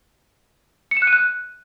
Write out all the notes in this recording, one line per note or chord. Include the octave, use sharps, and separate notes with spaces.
C#7
E7
F#6
D#7
F#6